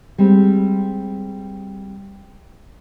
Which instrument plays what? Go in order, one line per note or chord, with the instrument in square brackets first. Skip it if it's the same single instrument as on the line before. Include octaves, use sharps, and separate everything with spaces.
[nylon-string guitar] G3 G#3 C4